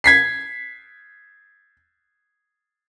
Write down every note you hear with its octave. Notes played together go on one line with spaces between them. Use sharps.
G#6 B6 C7